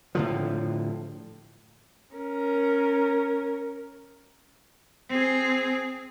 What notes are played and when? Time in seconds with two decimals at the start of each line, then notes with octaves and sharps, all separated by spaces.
0.15 A2 D3 F3
2.16 C#4 A#4
5.09 C4 G#4